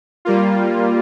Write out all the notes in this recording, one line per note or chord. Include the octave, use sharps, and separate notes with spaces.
G3 A#3 F4